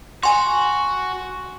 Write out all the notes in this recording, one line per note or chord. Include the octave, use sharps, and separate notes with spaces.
F#4 G#5 C6